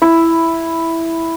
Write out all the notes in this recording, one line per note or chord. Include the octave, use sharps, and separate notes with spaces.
E4